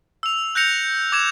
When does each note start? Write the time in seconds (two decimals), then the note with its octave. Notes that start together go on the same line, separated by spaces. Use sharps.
0.23 E6 F7
0.55 F#6 G6 A#6 C#7 F7
1.12 D6 G#6 E7